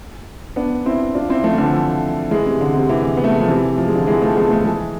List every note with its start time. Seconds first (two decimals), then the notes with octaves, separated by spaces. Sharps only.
0.56 B3 D4
0.86 C4 E4
1.15 D4 F4
1.29 C4 E4
1.44 F3 A3
1.54 E3
1.58 D3 F3
2.31 E3 G#3
2.46 C3
2.61 D3
2.76 C3
2.89 C3 E3
3.17 B3
3.24 A3
3.33 G#3
3.40 F3
3.48 C3 E3
3.78 F3
3.86 G#3
3.95 D3 F3
4.07 E3 G#3
4.22 F3 A3
4.36 G#3 B3
4.50 F3 A3
4.65 E3 G#3